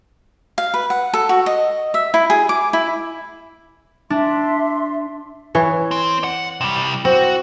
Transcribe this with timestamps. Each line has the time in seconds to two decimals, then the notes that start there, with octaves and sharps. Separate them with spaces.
0.58 F5
0.74 B4
0.90 F#5
1.14 A4
1.29 F#4
1.46 D#5
1.94 E5
2.14 E4
2.30 G#4
2.49 D6
2.73 E4
4.10 D4 E5 C6
5.55 E3 C#5
5.91 C4
6.24 F#5
6.61 C3 G3
7.05 C4 F#4